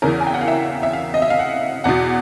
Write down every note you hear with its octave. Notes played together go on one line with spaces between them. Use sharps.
E2 C#3 E3 A#4
G#5
G5
F#5
F5
E5
E5
F5
D#5
E5
F5
F#5
E2 B2 F#5